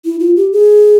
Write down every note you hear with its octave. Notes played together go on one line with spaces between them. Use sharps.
E4
F4
G4
G#4